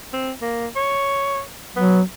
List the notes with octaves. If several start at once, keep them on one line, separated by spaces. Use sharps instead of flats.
C4
A#3
C#5
F#3 B3